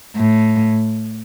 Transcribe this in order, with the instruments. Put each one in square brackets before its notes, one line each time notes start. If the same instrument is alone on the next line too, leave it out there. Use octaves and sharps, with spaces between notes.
[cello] A2